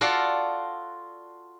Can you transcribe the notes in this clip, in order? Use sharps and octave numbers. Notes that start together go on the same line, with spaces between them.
F4 F#4 A4 D5 F5 A5